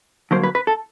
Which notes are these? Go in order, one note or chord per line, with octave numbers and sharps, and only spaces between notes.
G2 D3 F#3 A#3 C5
B4
B4
A4